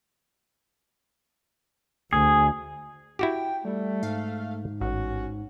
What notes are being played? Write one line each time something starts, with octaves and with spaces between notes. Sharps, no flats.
D2 G#4
E4 F#4 G4 G5
G3 A3
G#2 F5
A1 C#4 F#4